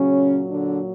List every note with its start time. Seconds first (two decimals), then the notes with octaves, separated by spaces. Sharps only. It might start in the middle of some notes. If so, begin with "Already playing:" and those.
Already playing: A#2 C#3 F#3 C#4
0.49 D3 D4